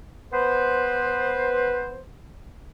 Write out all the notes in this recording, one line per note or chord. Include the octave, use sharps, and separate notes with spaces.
B3 B4 C5